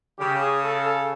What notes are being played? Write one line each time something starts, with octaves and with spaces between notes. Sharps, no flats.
C#3 G4
G#4
A4
A4